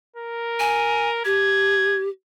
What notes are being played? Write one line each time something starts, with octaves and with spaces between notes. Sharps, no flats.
A#4
G#5
G4 G#6